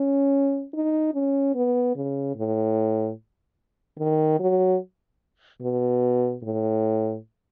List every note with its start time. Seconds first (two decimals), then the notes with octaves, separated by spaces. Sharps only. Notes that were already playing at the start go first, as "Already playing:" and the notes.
Already playing: C#4
0.74 D#4
1.14 C#4
1.55 B3
1.96 C#3
2.36 A2
3.99 D#3
4.40 F#3
5.62 B2
6.43 A2